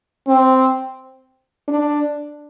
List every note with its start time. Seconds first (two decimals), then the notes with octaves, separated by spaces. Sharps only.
0.27 C4
1.68 D4